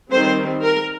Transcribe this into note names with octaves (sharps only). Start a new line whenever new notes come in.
D#3 G3 C4 C5
A#4